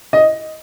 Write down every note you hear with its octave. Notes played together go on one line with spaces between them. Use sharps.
D#5